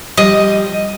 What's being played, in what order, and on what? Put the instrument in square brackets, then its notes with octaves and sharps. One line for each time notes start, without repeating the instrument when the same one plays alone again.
[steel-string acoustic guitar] F3 G3 [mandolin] D#5